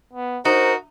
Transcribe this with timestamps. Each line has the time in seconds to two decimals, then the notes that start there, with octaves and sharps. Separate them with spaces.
0.13 B3
0.45 D#4 F#4 A#4 C5